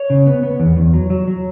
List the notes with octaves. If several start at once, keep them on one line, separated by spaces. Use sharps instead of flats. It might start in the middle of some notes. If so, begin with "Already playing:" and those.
Already playing: C#5
C#3
B3
B3
E2
E2
F#3
F#3
F#3